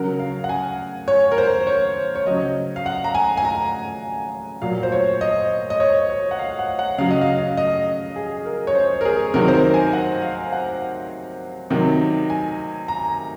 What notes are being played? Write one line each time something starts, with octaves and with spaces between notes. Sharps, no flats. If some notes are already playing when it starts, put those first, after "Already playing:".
Already playing: C#3 F#3 A#4
F5
F#5
G#5
C#5
A#4
C5
C#5
C#5
C#3 F#3 D#5
F5
F#5
A#5
G#5
G#5
A#5
A#2 F#3 F5
C5
C#5
D#5
D#5
C#5
C#5
F#5
F5
F#5
F#5
C#3 F#3 F5
D#5
F5
D#5
G#4
A#4
C#5
C5
A#4
G#4
C3 D#3 F#3 A#4
C5
A#4
G#5
F#5
F5
F#5
C3 D#3 F#3
G#5
A#5